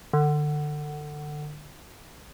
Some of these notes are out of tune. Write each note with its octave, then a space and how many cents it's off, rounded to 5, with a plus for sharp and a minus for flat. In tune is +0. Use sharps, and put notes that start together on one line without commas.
D3 +25